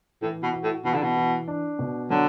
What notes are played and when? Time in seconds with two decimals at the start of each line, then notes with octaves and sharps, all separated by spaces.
0.22 A2 E3
0.43 B2
0.53 F#4
0.63 A2
0.85 B2 E3
0.94 D3
1.02 B2
1.16 E3
1.48 D4
1.79 B2
2.10 D3 F#3